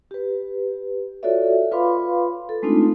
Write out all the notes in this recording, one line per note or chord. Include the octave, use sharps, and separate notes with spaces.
G4 B4
F4 F#4 A4 C#5 D5 E5
F4 B4 F5 B5 C6 D6
A4
G#3 A3 C4 D4 D#4 F4